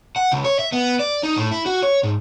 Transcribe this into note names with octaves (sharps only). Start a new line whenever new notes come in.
F#5
C#2
C#5
E5
B3
D5
D#4
A2
E4
F#4
C#5
G#2